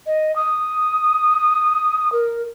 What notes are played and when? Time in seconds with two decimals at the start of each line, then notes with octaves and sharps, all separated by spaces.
0.06 D#5
0.36 D#6
2.12 A#4